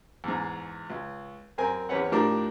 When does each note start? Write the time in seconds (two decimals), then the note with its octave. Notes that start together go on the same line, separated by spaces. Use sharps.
0.24 E2 G#2
0.90 C#2
1.58 F#2 C4 A#4 G#5
1.89 E2 C4 C#4 B4 C#5 F#5
2.12 A2 F3 G3 D4 A#4 D6